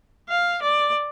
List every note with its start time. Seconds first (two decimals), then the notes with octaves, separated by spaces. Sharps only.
0.29 F5
0.62 D5